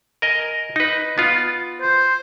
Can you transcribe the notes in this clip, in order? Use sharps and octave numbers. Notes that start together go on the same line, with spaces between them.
A#4 D#5 G#5
D#4 B4
B3 F4
C5